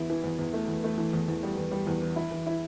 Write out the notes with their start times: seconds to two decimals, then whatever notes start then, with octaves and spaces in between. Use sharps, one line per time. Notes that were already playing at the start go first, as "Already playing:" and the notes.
Already playing: E2 E4
0.10 E3
0.24 E2
0.39 E2
0.53 A3
0.68 E2
0.84 A3
0.98 E3
1.13 E2
1.28 E2
1.43 G3
1.57 E2
1.72 G3
1.87 E2
2.02 E3
2.16 E4
2.31 E3
2.47 E4